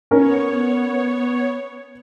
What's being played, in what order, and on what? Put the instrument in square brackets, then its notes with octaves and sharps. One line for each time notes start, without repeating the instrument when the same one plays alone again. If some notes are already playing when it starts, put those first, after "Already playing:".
[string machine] B3 C#5 [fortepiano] C#4 A#4